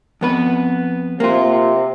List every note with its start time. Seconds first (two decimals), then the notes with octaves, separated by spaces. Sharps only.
0.21 F2 B3 B4
1.20 C3 A#3 F4